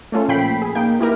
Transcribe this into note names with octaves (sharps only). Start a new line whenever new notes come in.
A3 C#4 F4 A4
A#2 F3 G5 B5 B6 C7
G#4
A#3 D#4 G5
A#3 E4 G4 A#4